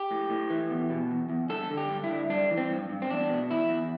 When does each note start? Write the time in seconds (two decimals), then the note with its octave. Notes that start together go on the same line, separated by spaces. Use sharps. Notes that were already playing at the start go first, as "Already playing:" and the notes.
Already playing: G4
0.11 A2
0.30 A2
0.50 E3
0.70 E2
0.90 B2
1.11 E2
1.30 E2
1.49 G2 A4
1.70 D3
1.77 G4
1.90 G2
2.04 E4
2.11 D3
2.30 G2 D4
2.51 E3
2.57 C4
2.71 G2
2.89 G2
3.02 C4
3.10 E2 D4
3.29 B2
3.50 E2 E4
3.69 E2